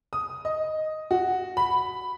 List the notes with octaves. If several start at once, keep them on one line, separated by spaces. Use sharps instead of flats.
D#6
D#5
F#4
B5